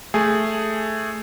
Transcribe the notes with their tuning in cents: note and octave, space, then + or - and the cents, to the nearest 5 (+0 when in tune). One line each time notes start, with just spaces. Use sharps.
A3 +0 G#4 +0